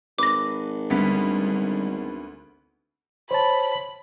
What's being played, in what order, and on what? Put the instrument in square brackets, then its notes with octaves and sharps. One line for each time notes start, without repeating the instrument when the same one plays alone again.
[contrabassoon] G#1 [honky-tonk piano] B4 [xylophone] D6 A#6
[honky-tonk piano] D2 B3 B6 [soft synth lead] G3
[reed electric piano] C5 C#5 A5 [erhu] B5